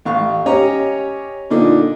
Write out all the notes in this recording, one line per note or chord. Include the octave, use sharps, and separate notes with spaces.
A1 F5 C#6
C#4 G4 C#5 D#5 A#5
A#2 D3 D4 D#4